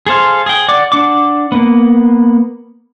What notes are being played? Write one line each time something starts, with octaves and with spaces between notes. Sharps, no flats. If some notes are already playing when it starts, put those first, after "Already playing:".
G#4 A4 C5 F5
G#4 G5
D5 F#5 D6
D4 F#5 D6
A#3 B3